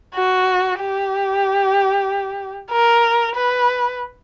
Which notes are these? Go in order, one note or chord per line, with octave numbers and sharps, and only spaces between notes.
F#4
G4
A#4
B4